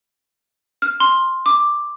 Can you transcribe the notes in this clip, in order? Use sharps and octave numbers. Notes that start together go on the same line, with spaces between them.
F6
C6
D6